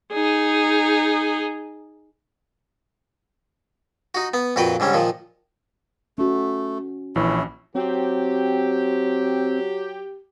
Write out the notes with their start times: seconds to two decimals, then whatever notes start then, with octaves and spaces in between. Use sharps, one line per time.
0.12 D#4 G#4
4.15 D#4 F#4
4.34 B3
4.56 F2 A#2 F#4 B4 G5
4.80 G#2 D3 G3 C#4
4.94 A#2 D#3 F3
6.18 A3 C#4 F#4
7.16 A#1 E3 C#4 E4
7.75 F#3 C4 G4